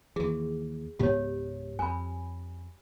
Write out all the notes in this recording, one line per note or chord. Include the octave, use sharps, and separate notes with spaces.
D#2 E3 G#4
C#2 G#2 B3 G4 C#5
F2 G#5 B5